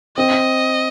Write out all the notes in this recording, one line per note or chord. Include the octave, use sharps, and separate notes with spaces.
C4 D#5